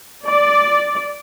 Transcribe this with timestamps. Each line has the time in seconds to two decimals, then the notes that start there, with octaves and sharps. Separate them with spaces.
0.25 D5